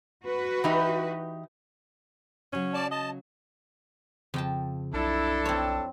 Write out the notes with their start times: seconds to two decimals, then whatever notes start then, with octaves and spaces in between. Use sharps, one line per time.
0.23 F#4 B4
0.64 E3 D#4 G4
2.53 C#3 F#3 C#4
2.74 D5 A5
2.91 D#5 A5
4.34 F2 C#3 G5 A5
4.94 B1 D4 E4 A4
5.45 C4 C#5